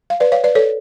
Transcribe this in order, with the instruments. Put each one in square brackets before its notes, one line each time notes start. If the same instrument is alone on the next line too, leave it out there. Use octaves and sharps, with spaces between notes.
[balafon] F5
B4 D5
C#5 F5
B4 D5
A4 C#5